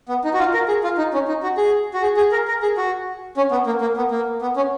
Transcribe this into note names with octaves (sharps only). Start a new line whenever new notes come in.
B3
D#4
F#4
F4
A#4
G#4
F4
D#4
C#4
D#4
F#4
G#4
F#4
G#4
G#4
A#4
A#4
G#4
F#4
C#4
B3
A#3
A#3
B3
A#3
B3
C#4